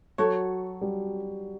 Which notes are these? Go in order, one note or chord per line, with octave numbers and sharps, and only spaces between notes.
F#3 F#4 A4 C#5
G3